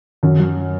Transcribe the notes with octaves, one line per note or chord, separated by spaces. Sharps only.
F#2 D#3
F#3